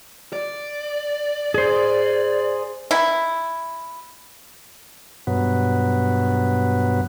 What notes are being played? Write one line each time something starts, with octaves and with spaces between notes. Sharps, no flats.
D5
G#4 C5
E4
G2 B2 F#3 B3